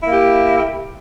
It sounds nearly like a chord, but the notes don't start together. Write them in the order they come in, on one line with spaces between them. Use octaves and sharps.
E4 A#3 G4